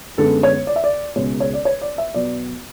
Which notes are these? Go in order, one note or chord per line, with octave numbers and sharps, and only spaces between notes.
F#2 D3 G#3 B3 A4
C#5
D5
E5
D5
C#2 B2 G#3 C#5
C#5
D5
C#5
D5
E5
B2 F#3 B3 D5